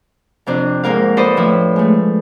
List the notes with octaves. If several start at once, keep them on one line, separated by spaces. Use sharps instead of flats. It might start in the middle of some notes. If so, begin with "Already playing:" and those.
F2 C3 D4
G#2 A#3 A#4 F5
A4 B4 C5 D5 D#5
A2 F3 E4
G#3 A3